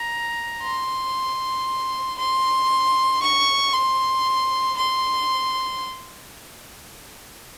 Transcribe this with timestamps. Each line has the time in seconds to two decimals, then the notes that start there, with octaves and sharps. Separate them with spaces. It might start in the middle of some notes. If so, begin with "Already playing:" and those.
Already playing: A#5
0.63 C6
2.18 C6
3.22 C#6
3.74 C6
4.77 C6